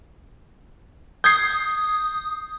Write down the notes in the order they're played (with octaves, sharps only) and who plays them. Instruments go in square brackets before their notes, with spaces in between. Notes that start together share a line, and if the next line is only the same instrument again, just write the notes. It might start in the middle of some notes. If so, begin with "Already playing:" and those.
[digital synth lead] D#6 [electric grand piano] G6 G#6 C7